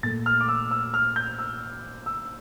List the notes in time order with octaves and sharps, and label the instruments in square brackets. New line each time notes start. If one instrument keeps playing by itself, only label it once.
[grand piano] A#2 A3 A6
F6
D6
E6
E6
F6
G6
E6
E6